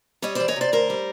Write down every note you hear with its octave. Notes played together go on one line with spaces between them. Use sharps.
G3 C#5 D#5
E3 C5 D5
C#5 D#5
C3 C5 D5
D2 A#4 C5
G3